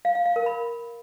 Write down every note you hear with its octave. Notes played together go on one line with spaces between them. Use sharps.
F5
F5
F5
A#4
B5